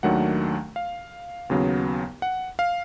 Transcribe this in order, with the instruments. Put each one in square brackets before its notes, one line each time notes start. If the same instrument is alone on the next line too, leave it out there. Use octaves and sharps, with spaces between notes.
[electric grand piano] D#2 D#3 F#3 A3 D4 F#5
F5
D#2 C#3 F#3 B3
F#5
F5